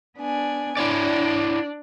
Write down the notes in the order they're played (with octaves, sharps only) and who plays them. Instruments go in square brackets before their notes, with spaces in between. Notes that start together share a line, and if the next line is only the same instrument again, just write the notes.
[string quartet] B3 D4 G#5
[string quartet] D4 [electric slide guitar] E4 C#5 D5